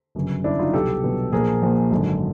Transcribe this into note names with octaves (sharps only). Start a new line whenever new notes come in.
G1 F#2 C#3
G1 F#2 C#3 D4 E4
D#4 F4
C2 B2 F#3 G4 A4
C2 B2 F#3
A#1 A#2 F3 G#4 A#4
A#1 A#2 F3
G#1 F#2 D3